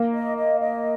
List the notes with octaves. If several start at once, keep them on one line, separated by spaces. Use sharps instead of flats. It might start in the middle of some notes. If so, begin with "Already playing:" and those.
Already playing: A#3
D#5
D#5
D#5